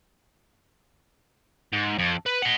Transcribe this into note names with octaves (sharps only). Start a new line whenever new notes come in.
G#2
F2
B4
D#5 F#5